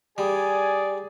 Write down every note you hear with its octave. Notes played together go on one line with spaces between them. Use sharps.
G3 G#4 D5 G#5